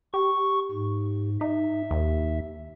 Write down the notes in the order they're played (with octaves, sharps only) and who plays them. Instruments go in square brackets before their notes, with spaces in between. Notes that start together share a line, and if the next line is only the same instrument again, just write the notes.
[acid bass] G4 [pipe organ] C#6
[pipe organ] G#2
[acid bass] D#4 [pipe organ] E5
[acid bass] D#2